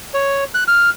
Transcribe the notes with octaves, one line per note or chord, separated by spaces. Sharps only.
C#5
F#6
F6